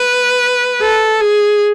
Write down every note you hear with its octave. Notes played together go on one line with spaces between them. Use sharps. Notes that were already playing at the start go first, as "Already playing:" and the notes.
Already playing: B4
A4
G#4